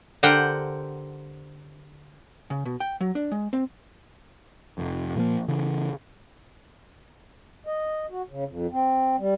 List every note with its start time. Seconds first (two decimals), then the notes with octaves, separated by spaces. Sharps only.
0.23 D3 G4 A#4 C5 F#5 G5
2.50 C#3
2.66 B2
2.80 G5
3.01 F#3
3.15 D4
3.32 G#3
3.53 C4
4.78 F1 F2
5.15 A#2 F3 A#3
5.48 C#3 E3
7.67 D#5
8.10 F#4
8.29 C#3
8.48 F2
8.72 C4
9.19 G3